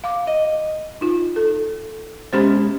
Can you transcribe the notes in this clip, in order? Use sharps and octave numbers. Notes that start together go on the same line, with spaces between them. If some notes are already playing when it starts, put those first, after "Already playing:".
F5 D6
D#5
D#4 F4
A4
B2 G#3 C#4 G4 C5 B5